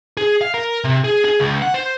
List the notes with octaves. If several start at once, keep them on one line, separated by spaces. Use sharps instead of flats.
G#4
F5
A#4
C3
G#4
G#4
C#2
F#5
C5